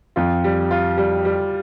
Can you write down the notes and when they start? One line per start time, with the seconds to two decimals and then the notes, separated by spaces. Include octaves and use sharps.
0.16 F2 F4
0.44 G3
0.71 F4
0.97 G3
1.25 G3